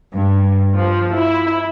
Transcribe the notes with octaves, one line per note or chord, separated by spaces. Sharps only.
G2
F3
E4